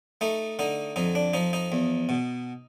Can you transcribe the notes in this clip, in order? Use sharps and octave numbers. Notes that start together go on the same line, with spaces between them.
A3 D#4
D3 D#4
F2 D#4
D4
F3 D#4
D#4
E2
B2